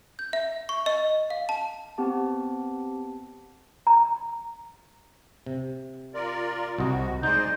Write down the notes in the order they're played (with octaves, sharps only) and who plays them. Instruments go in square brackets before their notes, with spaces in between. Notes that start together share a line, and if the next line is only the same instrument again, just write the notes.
[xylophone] G6
E5
C#6
D#5
F5
A5
[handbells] B3 C4 G4 A5
[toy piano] A#5
[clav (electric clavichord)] C3
[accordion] F4 A#4 D5
[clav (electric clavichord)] C2 D#5 [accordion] C3 F#4
[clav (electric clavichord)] G#3 D#4 [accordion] C5 D5 D#5 [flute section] C6 G6